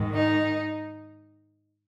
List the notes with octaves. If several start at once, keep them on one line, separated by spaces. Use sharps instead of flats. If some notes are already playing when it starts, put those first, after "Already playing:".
Already playing: G#2 D#3
D#4